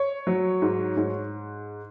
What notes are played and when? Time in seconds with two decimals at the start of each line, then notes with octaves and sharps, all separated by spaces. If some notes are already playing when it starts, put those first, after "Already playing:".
Already playing: C#5
0.27 F#3
0.62 G#2
0.97 G#2